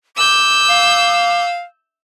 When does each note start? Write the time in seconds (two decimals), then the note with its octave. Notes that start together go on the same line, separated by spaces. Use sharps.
0.17 D6 E6 G6
0.70 F5